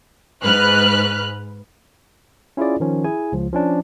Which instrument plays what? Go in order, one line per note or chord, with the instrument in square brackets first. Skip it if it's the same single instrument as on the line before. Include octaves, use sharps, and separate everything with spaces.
[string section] G#2 B4 F6 F#6
[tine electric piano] C#4 E4 F4 G#4 D5
D#3 F3 C#4
E4 G#4 G#5
C#2 F3
F3 C#4 D4